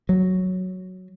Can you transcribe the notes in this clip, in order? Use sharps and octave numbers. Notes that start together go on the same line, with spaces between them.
F#3